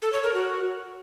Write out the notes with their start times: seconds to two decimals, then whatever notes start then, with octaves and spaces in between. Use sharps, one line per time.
0.02 A4
0.13 C#5
0.23 A#4
0.34 F#4